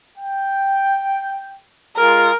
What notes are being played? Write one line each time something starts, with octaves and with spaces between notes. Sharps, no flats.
G5
G#3 F4 G#4 A#4